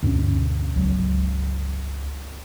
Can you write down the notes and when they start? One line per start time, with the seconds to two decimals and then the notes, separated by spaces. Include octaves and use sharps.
0.03 D2 G2 B2 C#4
0.76 G1 C#2 F#3